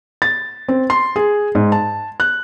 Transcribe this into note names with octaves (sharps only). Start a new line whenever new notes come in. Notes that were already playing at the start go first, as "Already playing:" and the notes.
A6
C4
C6
G#4
G#2
A5
F#6